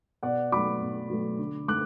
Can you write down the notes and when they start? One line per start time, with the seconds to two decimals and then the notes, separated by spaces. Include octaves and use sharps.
0.23 B2 D5 F#5
0.52 F#3 A3 B5 D6
0.81 B2
1.10 F#3 A3
1.39 D3
1.68 A3 D6 F#6